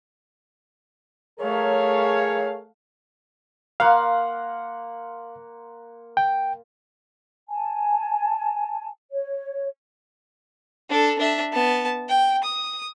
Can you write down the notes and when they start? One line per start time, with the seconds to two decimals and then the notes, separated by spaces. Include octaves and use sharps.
1.40 A3 G#4 A#4 C#5 F5
3.80 A#3 F5 F#5 C6
6.17 G5
7.48 G#5 A5
9.11 C#5
10.90 D4 A4
11.19 D4 E5
11.53 B3 A5
12.09 G5
12.44 D#6